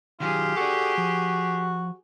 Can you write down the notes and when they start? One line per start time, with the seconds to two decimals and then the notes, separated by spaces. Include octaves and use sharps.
0.20 D#3 F#3 F4 G4 G#4
0.57 F#4 A4 D5
0.98 F3